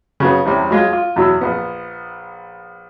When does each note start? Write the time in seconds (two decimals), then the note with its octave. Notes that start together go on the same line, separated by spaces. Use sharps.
0.20 C#3 F#3 B3
0.45 E2 C3 G3 C#4
0.71 F#3 G#3 F4
0.93 F4
1.16 E2 B2 F#3 E6
1.41 A#1 B3